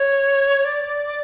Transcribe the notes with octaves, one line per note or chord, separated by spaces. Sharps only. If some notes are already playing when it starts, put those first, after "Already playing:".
Already playing: C#5
D5